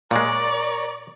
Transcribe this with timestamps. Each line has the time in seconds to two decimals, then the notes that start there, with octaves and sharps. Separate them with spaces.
0.11 A#2 G#3 A#4 C#5 D5